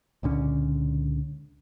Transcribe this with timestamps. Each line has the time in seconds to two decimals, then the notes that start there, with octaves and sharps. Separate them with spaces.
0.23 C#2 A#2 D3 C#4